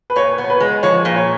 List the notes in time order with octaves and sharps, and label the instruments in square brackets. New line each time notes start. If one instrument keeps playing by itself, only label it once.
[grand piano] B4
[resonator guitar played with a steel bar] A#2 [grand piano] C#5
[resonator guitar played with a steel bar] B3
[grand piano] C#5
B4
[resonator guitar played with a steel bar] G#3
[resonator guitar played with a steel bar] F3 [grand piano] C#5
[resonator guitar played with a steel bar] A#2
[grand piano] C#5